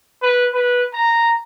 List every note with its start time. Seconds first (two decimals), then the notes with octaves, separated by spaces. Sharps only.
0.22 B4
0.54 B4
0.94 A#5